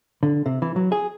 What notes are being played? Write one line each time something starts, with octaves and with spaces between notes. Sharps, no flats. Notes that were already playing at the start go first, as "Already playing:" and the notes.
D3
C3
E3
F#3
G#4